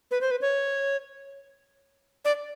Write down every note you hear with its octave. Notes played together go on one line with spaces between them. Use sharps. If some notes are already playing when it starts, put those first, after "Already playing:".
B4
C5
B4
C#5
D5